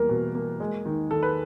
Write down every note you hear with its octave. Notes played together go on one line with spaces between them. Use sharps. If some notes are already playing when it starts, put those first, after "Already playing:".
Already playing: E2 G3 A#3 A#4
B2
A#3
G#3
D#3
D#3 A4
B4